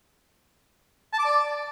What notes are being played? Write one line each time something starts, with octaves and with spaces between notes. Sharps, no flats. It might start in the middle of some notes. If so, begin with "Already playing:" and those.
A5
D6
D5